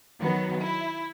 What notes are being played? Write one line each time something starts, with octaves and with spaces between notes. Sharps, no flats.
D#3 F#3 B3
E4